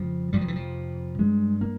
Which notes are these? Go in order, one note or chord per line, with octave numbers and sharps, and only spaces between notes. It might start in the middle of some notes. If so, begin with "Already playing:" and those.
Already playing: F2 C#3 F3
F2 C3 G3
F3
E3
F3
G2 G#3
A#3